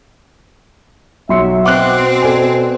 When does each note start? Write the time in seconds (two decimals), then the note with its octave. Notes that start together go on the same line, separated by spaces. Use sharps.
1.29 B1 F#3 E5 C6 C#7
1.64 B2 C4 F#5 D6 F#6
2.22 A4 D5 G#5